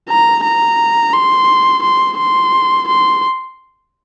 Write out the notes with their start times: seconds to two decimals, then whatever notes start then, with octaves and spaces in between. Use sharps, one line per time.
0.09 A#5
0.44 A#5
1.13 C6
1.83 C6
2.18 C6
2.88 C6